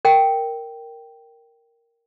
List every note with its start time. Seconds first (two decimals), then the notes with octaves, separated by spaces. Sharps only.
0.05 A#4 G5